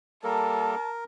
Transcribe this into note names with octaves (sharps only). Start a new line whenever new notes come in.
G3 A#3 A4 A#4 A5